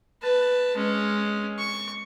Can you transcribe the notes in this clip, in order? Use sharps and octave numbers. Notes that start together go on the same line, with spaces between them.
B4 A5
G#3 C#4
C#6